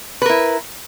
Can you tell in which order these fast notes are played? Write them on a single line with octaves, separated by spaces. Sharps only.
B4 A#4 E4